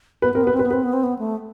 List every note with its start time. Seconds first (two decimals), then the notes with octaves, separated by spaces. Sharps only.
0.22 B3 B4
0.33 C4 A#4
0.43 B3 B4
0.53 C4
0.59 B4
0.63 B3
0.71 C4 B4
0.83 B3
0.93 C4
1.04 B3
1.19 A3